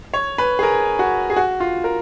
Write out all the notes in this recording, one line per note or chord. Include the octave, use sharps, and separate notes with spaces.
C#5
B4
G#4
A#4
F#4
G#4
F#4
F4
A#4